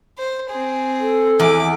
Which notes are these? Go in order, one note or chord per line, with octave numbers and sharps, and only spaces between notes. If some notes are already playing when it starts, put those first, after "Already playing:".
C5
C4 G#4
A4
E2 G#5 D6